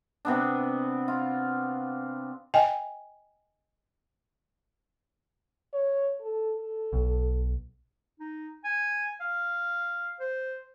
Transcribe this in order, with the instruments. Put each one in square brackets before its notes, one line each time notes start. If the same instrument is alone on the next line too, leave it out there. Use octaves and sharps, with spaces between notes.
[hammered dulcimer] C3 B3 D4
F4
[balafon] D#5 G5 G#5
[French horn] C#5
A4
A4
[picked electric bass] B1
[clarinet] D#4
G#5
F5
C5